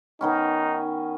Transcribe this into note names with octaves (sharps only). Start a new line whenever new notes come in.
D#3 B3 C#4 D#4